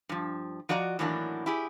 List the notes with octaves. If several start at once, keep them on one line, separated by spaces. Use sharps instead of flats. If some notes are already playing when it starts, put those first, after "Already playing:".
G2 F3
F3 F#4 D5 D#5 A#5
A2 D#3 E3 F#3 A#3 D4
E4 G4 G#4